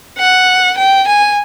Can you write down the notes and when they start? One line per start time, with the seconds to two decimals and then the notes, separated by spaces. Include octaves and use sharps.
0.18 F#5
0.78 G5
1.07 G#5